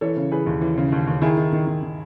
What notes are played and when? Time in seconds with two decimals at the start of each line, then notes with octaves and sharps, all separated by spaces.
0.01 E3 A4 C#5
0.17 C#3
0.32 E3 G#4 B4
0.46 D#2
0.61 E3
0.77 C#3
0.92 D#2
1.07 D#2
1.22 D#3 E4 G#4
1.37 D#3
1.53 D#3
1.67 D#3
1.82 D#3